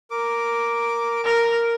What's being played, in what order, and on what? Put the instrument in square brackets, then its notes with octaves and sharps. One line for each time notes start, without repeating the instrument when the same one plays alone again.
[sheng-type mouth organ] A#4 D6
[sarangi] A#4